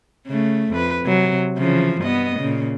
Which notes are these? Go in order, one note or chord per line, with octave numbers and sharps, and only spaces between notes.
C#3 A3
F2 B4
C3 F#3
C#3 E3 F3
G2 B3 D#5
A#2 C#3